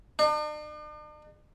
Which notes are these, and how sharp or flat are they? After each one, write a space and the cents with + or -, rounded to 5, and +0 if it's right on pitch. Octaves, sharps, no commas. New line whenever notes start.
D4 +45